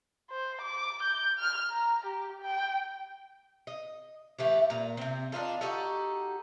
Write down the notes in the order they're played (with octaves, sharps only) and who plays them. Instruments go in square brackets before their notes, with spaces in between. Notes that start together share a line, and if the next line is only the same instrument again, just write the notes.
[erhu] C5
D6
G6
F6
A#5
G4
G5
[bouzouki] D#5
A2 E3 A3 G4
A#2 A#5
C3 C4
D4 D#4 F4 A4
D#4 F#4 G4 A4